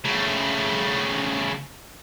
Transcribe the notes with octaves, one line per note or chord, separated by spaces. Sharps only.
C#3 A3